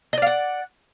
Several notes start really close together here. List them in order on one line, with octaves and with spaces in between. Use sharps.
D#5 D5 F5 F#5